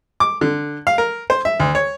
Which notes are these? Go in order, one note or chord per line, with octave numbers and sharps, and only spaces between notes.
D6
D3
F5
A#4
C5
E5
D2
C#5